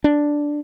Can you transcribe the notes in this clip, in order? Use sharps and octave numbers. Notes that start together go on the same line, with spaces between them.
D4